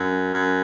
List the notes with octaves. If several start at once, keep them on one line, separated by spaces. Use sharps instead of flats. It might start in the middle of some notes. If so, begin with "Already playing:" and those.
Already playing: F#2
F#2